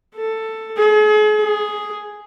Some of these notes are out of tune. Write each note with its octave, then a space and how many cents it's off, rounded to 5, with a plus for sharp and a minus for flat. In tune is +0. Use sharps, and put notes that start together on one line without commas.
A4 +10
G#4 +40
G#4 +0